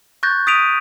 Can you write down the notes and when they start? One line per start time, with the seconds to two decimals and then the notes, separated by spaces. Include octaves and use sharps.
0.23 C#6 F#6 G6 A6 A#6
0.47 D#6 A6 B6 D7 D#7 F7